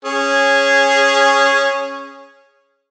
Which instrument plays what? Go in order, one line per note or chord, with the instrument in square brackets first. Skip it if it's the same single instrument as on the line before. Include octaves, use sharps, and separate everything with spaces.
[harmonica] C#4 G#4